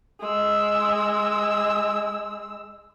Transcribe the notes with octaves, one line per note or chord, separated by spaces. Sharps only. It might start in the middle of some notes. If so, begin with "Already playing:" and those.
G#3 E6